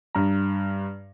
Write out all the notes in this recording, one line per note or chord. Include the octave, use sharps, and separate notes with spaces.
G2 A#5